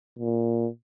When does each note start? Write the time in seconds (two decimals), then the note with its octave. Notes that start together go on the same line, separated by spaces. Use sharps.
0.19 A#2